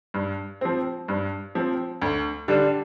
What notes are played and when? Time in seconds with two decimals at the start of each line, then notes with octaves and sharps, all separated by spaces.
0.14 G2
0.61 F3 C4
1.08 G2
1.55 F3 C4
2.02 D2
2.48 D3 G3 D4